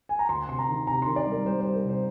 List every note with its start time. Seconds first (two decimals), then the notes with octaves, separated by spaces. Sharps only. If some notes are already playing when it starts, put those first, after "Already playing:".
0.09 G#5
0.19 A#5
0.29 D2 C6
0.48 C3 C6
0.59 A#5
0.68 D#3
0.87 C3 A#5
1.02 D#3 C6
1.16 D5
1.26 G3 A#4
1.45 G3 C5
1.61 G3 C5
1.75 A#4
1.85 C3 C5